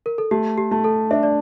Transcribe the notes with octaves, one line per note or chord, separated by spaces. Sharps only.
A#4
A4
A3 G4
G4
A3
A4
D4 E5
D5